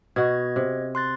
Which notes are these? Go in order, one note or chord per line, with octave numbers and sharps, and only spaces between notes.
B2 F#4 D#5 G#6
C3
C6 F#6 A6